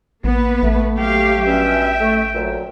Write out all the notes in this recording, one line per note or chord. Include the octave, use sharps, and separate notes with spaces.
A1 A#3 B3 B4
A1 A3
F#3 G4 F5 G5
G2 B2 C#4 E5
A3
D2 A#2 F#3